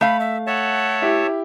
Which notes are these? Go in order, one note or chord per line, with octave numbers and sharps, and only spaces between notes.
A3 F5 B5
E5
C#5 E5 F#5 A5
E4 G4